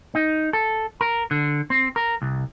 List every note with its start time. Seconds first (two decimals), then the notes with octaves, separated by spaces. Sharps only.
0.15 D#4
0.53 A4
1.01 A#4
1.31 D3
1.70 C4
1.96 A#4
2.22 C2